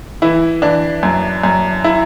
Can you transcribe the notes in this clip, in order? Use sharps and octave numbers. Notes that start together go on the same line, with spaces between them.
E3 E4
E3 D4
F#2
F#2
E4